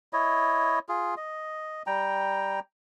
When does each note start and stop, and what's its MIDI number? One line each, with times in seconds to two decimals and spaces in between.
0.13 0.79 64
0.13 0.79 73
0.13 0.79 75
0.89 1.15 65
0.89 1.15 68
1.17 1.83 75
1.87 2.60 55
1.87 2.60 79
1.87 2.60 82